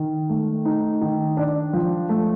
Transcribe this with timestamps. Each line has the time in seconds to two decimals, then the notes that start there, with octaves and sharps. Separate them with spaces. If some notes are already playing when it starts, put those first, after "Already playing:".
Already playing: D#3
0.29 A3
0.65 D#4
1.01 D#3
1.37 D4
1.73 F3
2.09 A3